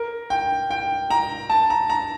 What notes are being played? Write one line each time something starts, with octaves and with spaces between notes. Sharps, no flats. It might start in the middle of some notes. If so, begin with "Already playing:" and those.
Already playing: A#4
G5
G5
A#5
A5
A#5
A#5